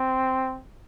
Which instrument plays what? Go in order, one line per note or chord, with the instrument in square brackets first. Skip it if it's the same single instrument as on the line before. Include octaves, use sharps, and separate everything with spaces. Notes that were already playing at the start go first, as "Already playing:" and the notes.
Already playing: [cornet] C4